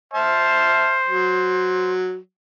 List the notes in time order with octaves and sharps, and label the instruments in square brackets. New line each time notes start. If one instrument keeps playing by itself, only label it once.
[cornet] C5 [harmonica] E5 A5 F6
[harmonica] F#3